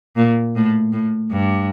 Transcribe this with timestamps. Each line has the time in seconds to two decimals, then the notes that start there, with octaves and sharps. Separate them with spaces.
0.16 A#2
0.56 A2
0.93 A2
1.31 G2